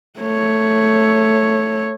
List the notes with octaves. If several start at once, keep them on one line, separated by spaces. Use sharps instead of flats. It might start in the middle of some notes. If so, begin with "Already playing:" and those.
A3 C#5